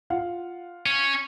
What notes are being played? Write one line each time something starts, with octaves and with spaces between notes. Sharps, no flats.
F4 F5 F#5
C#4